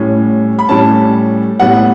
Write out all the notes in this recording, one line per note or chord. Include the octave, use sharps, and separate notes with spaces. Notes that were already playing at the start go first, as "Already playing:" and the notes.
Already playing: A2 G3 C#4
B5
A2 G3 C#4 A5
A2 G3 B3 F#5